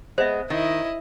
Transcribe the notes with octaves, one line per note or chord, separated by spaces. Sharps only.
G#3 B3 C5 E5
D#3 E4 D#5